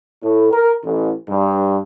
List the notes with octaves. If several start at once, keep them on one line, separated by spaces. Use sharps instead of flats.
A2
A#4
A1
G2